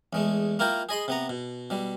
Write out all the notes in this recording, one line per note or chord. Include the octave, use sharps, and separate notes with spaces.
E2 G#3 A3
A#3 E4 F4 A#4 G5
G#4 D#5 B5 C6
C3 B3 A#5
B2
B2 G3